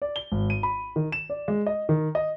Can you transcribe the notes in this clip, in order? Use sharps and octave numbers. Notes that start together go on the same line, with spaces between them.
D5
G7
G#1
D#7
B5
D#3
E7
D5
G#3
D#5
D#3
D#5